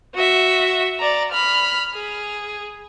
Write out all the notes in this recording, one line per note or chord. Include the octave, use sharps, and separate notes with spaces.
F#4 E5
D5 A#5
B5 F6
G#4